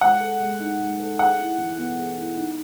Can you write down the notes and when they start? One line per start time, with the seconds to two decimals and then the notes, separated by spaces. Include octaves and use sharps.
0.01 G#3 F#5
0.20 A4
0.40 G#3
0.60 D#4
0.80 G#3
0.99 A4
1.19 G#4 F#5
1.39 E4
1.58 E3
1.78 B3
1.98 G#4
2.17 E4
2.37 D#4